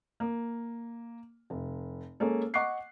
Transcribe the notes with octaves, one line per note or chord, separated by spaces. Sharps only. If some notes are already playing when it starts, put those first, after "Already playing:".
A#3
F1
G#3 A#3 C#4 A4
D#5 F#5 C#6 D6 F#6 C7